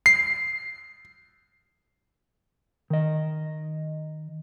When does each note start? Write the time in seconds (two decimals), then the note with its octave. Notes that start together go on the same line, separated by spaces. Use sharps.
0.06 C7
2.90 D#3 D#5